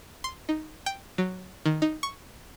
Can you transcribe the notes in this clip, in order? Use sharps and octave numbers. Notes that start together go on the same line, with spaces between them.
C6
D#4
G5
F#3
D#3
D#4
C#6